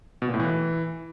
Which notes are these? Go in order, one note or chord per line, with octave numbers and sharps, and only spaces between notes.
B2
A#2
A2
E3